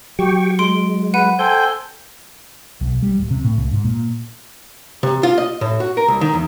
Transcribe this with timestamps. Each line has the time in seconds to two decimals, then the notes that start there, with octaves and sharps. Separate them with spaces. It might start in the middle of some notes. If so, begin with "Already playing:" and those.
0.19 F#3 G4 G5 C#6
0.59 G#3 C6 D7
1.14 B4 F#5 D#7
1.39 A4 C5 G5 G#5 G6
2.81 B1
3.03 G3
3.19 D1
3.31 C3
3.45 A2
3.58 C2
3.72 G#2
3.84 A#2
5.03 C3
5.23 F4
5.38 D#5
5.61 A2
5.80 F#4
5.97 A#4
6.08 C2
6.21 D#3
6.34 E2